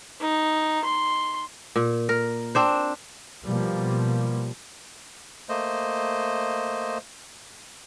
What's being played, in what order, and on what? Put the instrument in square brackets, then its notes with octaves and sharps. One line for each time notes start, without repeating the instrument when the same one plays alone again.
[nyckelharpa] D#4
C6
[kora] A#2
A#4
C4 D4 C5
[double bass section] B2 F3 G3 A#3
[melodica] A3 A#3 C5 D#5